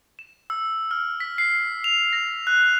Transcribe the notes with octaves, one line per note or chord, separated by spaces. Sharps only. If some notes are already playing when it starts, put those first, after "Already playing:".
E7
E6
F6
B6
C7
F7
A#6
F#6